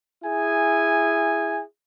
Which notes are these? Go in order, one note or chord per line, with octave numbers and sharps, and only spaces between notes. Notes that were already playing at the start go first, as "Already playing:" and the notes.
E4 G#4 G#5